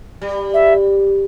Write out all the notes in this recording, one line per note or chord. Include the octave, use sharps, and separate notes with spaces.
G3
E5